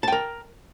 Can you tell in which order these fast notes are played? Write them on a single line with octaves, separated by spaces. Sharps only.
A5 G5 A#4